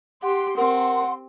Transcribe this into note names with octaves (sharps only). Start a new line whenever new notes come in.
G4 F#5 C6
C4 A#4 F#5